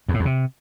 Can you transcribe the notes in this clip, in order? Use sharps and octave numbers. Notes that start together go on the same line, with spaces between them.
E2
A2
E2
C3